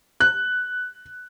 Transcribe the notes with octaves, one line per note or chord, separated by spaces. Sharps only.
F#6